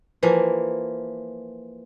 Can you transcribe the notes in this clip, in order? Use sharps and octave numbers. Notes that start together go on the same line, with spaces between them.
E3 F3 A#3